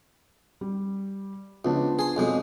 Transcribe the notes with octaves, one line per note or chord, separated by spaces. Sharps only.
G3
C#2 F3 B3 D4
G#4 C6
B1 F2 G#3